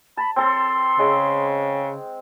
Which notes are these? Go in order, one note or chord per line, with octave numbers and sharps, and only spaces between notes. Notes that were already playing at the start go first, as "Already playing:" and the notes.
A5 B5
C4 A4 C6
C#3 G#3